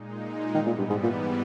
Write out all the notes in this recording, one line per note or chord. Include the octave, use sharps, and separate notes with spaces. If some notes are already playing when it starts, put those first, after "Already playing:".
Already playing: A#2 G#3 D#4
G#2 D#3 E3 G3 B3
A#2
G2
G#2
A#2